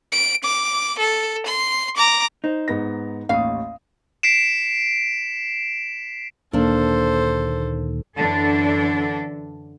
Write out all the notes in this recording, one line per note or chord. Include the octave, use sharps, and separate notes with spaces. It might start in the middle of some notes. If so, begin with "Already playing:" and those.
D7
D6
A4
C6
A#5 D6
D#4 C5
G#2 B3 A#6
A1 D#2 F5 D#6
B6 C7 D7 E7
D2 A#2 D#3 A#3 D4 A4 C5
F#2 D3 E3 D4 A4